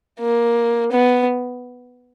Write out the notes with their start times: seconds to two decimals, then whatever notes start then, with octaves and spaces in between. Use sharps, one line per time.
0.20 A#3
0.91 B3